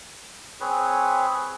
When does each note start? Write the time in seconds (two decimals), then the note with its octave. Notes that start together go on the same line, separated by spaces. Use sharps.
0.60 C4 G#4 B4 C#5